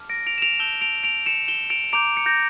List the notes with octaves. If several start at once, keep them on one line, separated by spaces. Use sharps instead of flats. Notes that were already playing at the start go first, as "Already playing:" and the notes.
Already playing: A5 D6 F6
A#6 D7
D7 F7
E7
D7 F7
A5 E6 G6 E7 G7
D7 F7
D7 F7
C#7 E7
E7 G7
D7 F7
A#5 D6 G6 D7 F7
C#7
G6 A#6